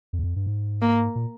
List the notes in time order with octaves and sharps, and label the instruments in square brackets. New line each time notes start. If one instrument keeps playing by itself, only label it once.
[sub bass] F2
E2
F2
G2
G#2
[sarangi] A#3
[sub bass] A#2